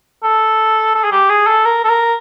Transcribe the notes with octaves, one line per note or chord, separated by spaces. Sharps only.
A4
A4
G#4
G4
G#4
A4
A#4
A4
A#4